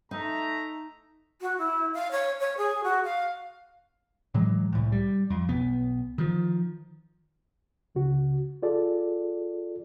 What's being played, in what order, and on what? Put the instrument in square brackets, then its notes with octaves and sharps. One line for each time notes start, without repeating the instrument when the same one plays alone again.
[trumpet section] A3 E5 A#5 [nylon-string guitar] D#4
[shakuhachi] F#4
E4
F5
C#5
C#5
G#4
F#4
F5
[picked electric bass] A2 E3 F#3 G#3
C2 A2
G3
F2
B1 B3
D#3 F3
[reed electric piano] C#2 C#3 F#4
F4 G#4 A4 D5